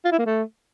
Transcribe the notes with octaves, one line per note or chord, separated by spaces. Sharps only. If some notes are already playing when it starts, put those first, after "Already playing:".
F4
E4
A#3
A3